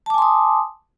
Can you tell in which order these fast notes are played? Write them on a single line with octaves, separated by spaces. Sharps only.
A5 D6 G#5 C6 D#6